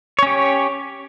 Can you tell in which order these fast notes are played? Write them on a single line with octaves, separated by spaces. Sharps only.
C#5 C#4 G4